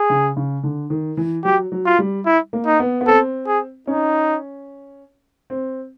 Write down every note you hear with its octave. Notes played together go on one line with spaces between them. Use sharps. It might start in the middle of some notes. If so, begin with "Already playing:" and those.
Already playing: G#4
C#3
C#3
D3
D#3
E3
F#3 G4
F#3
F4
G3
E4
A#3
D#4
B3
B3
C4 A4
G#4
C#4 D#4
C4